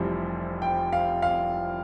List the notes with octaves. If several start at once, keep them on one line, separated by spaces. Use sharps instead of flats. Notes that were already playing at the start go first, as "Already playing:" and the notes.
Already playing: F1 F2 C3 E3 G3
G5
F5
F5